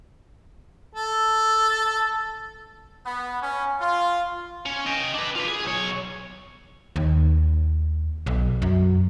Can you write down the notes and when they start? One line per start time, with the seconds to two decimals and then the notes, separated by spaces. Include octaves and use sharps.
0.96 A4
3.05 B3
3.42 C#4
3.81 F4
4.66 C#4
4.86 D#5 G5
5.14 D4 B4
5.36 F4 B4
5.48 G#4
5.65 B1 C#5
6.96 D#2
8.26 B1
8.62 F#2